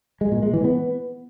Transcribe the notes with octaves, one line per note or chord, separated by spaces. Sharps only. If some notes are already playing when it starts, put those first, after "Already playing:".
G#3
A#2
G#3
E3
B3